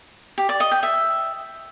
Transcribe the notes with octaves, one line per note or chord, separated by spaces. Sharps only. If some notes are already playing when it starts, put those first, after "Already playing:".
G4
D5
D#5
G5
E5